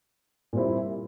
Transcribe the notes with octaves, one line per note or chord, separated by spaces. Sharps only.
A#2 G3 C4 E4